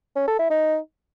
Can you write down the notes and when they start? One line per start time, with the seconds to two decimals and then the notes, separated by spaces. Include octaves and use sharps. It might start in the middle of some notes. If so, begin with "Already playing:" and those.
0.16 C#4
0.28 A4
0.39 E4
0.51 D#4